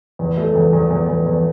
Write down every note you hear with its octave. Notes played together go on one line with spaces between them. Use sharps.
E2
A3
E2
E2
E2
E2
E2